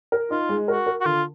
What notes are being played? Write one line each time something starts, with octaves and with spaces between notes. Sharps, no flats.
A#4
D#4 F4
G#3
F#4 A#4
A#4
F#4
D3 F4